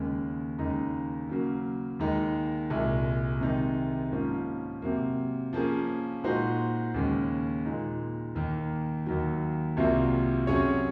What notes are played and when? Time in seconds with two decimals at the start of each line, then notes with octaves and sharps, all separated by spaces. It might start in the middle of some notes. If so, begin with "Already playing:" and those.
Already playing: D#2 C#3 G#3
0.59 D#2 C#3 G#3 D#4
1.29 C#3 F#3 A#3
1.99 D#2 D#3 G#3 D#4
2.70 C2 A#2 G#3
3.41 C3 D#3 G#3 D#4
4.12 G#2 F3 A#3 C#4
4.82 C3 F#3 A#3
5.53 F3 A#3 C#4 G#4
6.24 A#2 G#3 D#4 F#4 C5
6.94 D#2 C#3 G#3 C#4
7.65 A#2 G#3 D#4
8.35 D#2 D#3 A#3
9.06 D#2 D#3 F#3
9.77 C2 C3 F#3 A#3 F4
10.47 C3 F#3 C#4 G#4 C#5